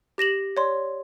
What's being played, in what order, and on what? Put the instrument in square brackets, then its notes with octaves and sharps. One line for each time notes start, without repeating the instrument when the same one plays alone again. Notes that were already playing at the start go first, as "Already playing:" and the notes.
[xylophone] G4 A#6 E7 F#7
C#5 D5 C6